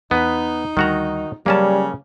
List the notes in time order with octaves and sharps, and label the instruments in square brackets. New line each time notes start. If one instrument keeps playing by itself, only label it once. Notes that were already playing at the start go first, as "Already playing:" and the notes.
[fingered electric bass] E2 [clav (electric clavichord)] B3 B4 [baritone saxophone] D#4
[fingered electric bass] D2 G3 [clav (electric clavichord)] D#3 F#4 A#5
[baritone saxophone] C#3 [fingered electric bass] F#3 [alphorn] G3 [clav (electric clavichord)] A#3 C#4 A5